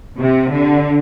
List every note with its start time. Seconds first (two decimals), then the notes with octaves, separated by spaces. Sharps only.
0.17 C3
0.51 D3